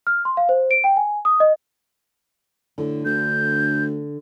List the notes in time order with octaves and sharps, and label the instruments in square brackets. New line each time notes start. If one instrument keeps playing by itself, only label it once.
[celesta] F6
C6
F5
C5
D7
G5
G#5
D#6
D#5
[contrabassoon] A2 [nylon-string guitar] D3
[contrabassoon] D2 [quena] G6